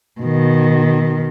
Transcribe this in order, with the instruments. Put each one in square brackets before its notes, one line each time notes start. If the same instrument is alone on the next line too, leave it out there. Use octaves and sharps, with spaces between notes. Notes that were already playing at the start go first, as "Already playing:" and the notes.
[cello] B2 D#3